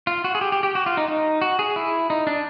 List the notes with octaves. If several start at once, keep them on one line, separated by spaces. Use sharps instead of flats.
F4
F#4
G#4
G4
G4
G4
F#4
F4
D#4
D#4
F#4
G#4
E4
D#4
D4